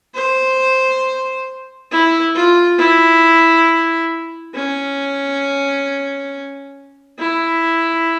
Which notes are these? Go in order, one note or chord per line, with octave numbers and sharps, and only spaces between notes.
C5
E4
F4
E4
C#4
E4